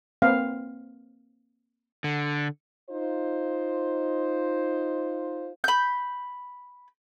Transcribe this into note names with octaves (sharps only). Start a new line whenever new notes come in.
A#3 C4 B4 F5 F#5
D3
D#4 F4 C5
B5 G6